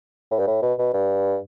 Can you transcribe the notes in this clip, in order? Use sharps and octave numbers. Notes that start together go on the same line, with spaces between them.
A2
G2
A2
B2
B2
G2